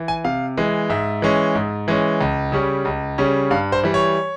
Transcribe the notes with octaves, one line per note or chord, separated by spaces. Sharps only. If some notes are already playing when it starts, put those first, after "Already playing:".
Already playing: E3
G#5
C3 F5
E3 G#3
G#2 E5
E3 G#3 C#4
G#2
E3 G#3 C#4
C#2
C#3 G3 C#4
C#2
C#3 G3 C#4
G2 F5
C5
E3 G3
C#5